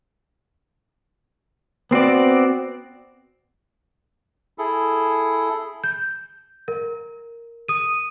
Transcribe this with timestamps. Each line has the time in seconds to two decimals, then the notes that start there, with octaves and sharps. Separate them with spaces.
1.91 B3 C4 F#4 D5
4.58 E4 G#4 A4
5.84 G6
6.68 A#4
7.68 D#6 D#7